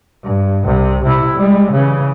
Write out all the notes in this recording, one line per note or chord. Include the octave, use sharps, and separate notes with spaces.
G2
C2 C3
C3 E4
G3 G#3
C#3 E3